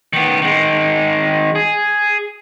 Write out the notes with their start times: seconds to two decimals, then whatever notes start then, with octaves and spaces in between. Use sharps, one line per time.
0.13 D#3 B3
0.42 D#3 G#3
1.55 G#4